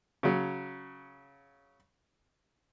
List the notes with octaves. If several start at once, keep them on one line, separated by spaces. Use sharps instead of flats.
C#3 F#3